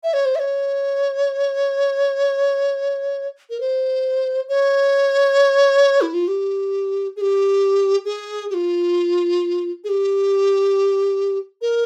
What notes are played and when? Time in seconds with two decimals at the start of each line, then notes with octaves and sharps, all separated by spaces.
0.04 E5
0.14 C#5
0.25 C5
0.36 E5
0.39 C#5
3.50 A#4
3.60 C5
4.49 C#5
6.01 E4
6.14 F4
6.28 G4
7.16 G#4
7.21 G4
8.05 G#4
8.50 G4
8.54 F4
9.84 G#4
9.89 G4
11.62 A#4